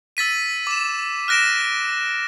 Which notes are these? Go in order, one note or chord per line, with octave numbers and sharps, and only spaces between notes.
E6 A6 B6 D#7
D6 E7
F6 F#6 A#6 D7 E7